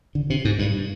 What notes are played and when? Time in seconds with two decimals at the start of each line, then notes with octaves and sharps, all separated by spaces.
0.15 D3
0.30 C3
0.45 G#2
0.59 G2